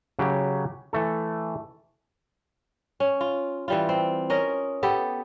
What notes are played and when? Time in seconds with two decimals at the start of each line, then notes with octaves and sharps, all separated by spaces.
0.19 C#3 F#3 G4
0.93 E3 A3 A4
3.00 C#4
3.21 F4
3.68 E3 G3 F4
3.89 C4
4.30 C#4 A#4 D#5
4.83 B3 G4 A4